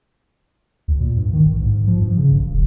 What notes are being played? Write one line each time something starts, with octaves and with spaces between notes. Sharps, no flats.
D2
A#2
G2
D#3
A#1
G#2
F3
G2
C#3
A1
E1